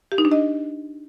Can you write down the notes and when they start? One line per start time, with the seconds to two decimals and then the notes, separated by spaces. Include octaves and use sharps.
0.12 G4
0.18 D#4
0.25 D4
0.32 D#5